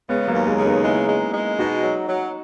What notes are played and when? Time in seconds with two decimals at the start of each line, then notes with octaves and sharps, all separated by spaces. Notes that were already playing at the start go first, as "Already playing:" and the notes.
0.09 C#3 G#3 B3
0.28 F#3 A#3
0.35 D#2
0.47 G#3 B3
0.59 C#3
0.65 B3 D#4
0.84 G#3 C#4 E4
1.09 G#3
1.34 G#3
1.59 B2 D#4 F#4
1.84 F#3
2.09 F#3